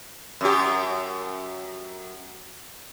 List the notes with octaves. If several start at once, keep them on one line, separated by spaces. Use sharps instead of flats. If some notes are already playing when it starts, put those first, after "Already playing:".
F#2 G4